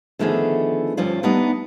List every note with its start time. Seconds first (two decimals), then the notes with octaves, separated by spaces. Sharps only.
0.19 D3 D#3 F3 A3 B3 G#4
0.97 D2 G2 F3 C#4 F4 D5
1.23 G3 A3 B3 D4 D#4